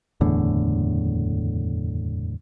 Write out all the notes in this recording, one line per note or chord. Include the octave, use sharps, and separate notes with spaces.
F#1 E2 A2 D3